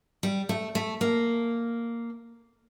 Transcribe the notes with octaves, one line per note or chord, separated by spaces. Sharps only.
G3
A3
A3
A#3